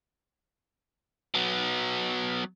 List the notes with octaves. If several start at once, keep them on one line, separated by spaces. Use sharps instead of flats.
F#3 B3